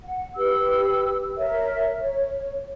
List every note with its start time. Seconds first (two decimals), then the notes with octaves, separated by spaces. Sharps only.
0.02 F#5
0.37 G4 B4 E6
1.38 A#4 C#5 E5
2.01 C#5